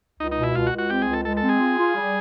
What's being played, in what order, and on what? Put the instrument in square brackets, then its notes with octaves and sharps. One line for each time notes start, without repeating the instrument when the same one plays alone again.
[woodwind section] C#2 [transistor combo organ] D#4
[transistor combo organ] D#4
[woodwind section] B2
[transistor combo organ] E4
[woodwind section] C#2 [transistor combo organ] F4
[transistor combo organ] F#4
[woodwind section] C#2
[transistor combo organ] F#4
[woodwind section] C4 [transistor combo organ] G4
[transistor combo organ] G#4
[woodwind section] C#2
[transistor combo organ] A4
[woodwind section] G#3 [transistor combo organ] A4
[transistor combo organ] A4
[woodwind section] C4
[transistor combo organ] G#4
[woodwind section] F4
F4
G3